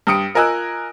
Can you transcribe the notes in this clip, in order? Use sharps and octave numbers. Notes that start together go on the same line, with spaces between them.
G2 G4 D#6 C#7 D7
F4 A#4 D#5 G#5 E6 F#6